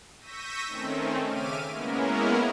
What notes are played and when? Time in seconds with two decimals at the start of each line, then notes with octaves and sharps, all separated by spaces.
0.19 C#6 E6 G6 A#6 B6 D#7
0.67 D#3 A3 C4 C#4
1.26 C#3 E5 D6 F6 D#7
1.70 G#3 A#3 B3 C#4 E4 A#4